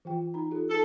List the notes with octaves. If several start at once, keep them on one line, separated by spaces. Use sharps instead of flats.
E3 F4 G5
D#4 A#5
F4 G4 A4
D#4 A4